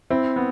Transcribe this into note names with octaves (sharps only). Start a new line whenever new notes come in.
C4 E4
B3